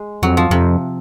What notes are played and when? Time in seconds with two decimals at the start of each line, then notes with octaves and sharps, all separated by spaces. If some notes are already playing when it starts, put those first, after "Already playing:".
Already playing: G#3
0.23 F2 F#3
0.37 F3
0.51 F2 C3